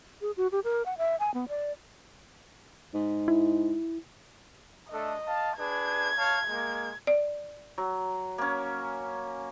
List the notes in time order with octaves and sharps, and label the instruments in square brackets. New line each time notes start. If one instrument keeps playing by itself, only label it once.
[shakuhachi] G#4
F#4
G4
A#4
F#5
E5
G#5
B3
D5
[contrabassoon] G#2
[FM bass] E4
[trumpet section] A3 D4 A4 [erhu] D#5
[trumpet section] F5 A5
[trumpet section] D4 G#4 B4 [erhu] G#6
[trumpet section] C#5 F5 A5
G#3 A#3
[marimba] D5
[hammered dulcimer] F#3
A#3 C#4